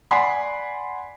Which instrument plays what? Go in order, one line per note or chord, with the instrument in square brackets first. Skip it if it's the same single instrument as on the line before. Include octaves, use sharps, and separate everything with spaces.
[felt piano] D5 F#5 G#5 B5 C6 B6